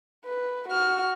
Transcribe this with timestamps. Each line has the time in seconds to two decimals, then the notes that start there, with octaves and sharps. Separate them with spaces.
0.25 B4
0.69 F#4 F6